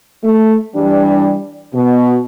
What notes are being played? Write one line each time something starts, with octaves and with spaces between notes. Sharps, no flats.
A3
E3 G3 D4
B2